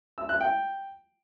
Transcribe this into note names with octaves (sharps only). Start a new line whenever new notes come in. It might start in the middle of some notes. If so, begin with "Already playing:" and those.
E6
F#6
G5